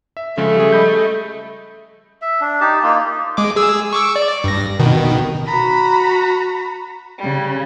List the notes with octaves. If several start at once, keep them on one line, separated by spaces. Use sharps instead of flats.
E5
C#3 F3 G#3 A3
G3 G#4
D#5 B5 G6
E5
D4
D#4 G4 A5
A#3 D#4 F4
G#3 D6
G#4 E6
C#6 D6 E6
D5
G2 A#6
B2 D#3
F#4 A#5 B5
C#3 G3